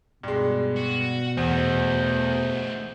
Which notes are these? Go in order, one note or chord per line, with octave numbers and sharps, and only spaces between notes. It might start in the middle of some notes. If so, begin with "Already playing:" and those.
G2 B2 G#3
F#4
E2 A3 D#4 C5